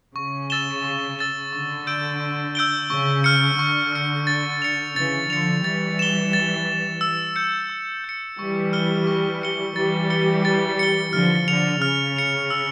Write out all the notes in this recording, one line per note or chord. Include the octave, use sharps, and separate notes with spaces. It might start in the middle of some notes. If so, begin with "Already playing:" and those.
C#3 C#6
E6 A6 E7 G7
C#6
E6 A6 E7 G7
D3 C#6
E6 G6 D7 G7
C#6
E6 G6 D7 G7
C#3 C#6
F6 C#7
D3 C#6
F6 C#7
A6
C#7 F7
C#3 E3 A6
D3 F3 C#7 F7
E3 G3 A6
E7 G7
A6
G7
E7
E6
G6 C#7
E6
G6 C#7
E3 G3 C#6
F6 C#7 G7
C#6
F6 C#7 G7
E3 G3 A6
C#7 G7
A6
C#7 G7
D3 F3 F6
D3 C#7 F7
C#3 F6
C#7 F7
E6